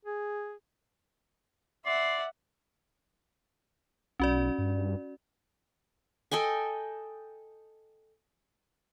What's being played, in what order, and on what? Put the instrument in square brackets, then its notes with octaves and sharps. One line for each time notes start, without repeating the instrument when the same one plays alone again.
[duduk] G#4
[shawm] D5 [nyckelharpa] E5 F#5 [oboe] C6
[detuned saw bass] B1 [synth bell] C#4 F#4 D5
[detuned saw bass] G2
[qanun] A4 D#5 G5 G#5